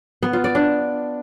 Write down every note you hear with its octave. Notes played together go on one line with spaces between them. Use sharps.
B3
F4
D5
D4